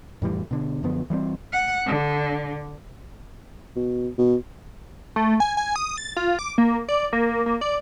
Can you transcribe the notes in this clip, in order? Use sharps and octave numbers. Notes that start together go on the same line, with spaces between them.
F2 A2 E3 G3
B2 D3
F#2 D3 F3 B3
E3 G3 G#3 C4
F#5
D3
B2
B2
A3
G#5
G#5
D#6
A6
F4
D6
A#3
D5
A#3
A#3
D5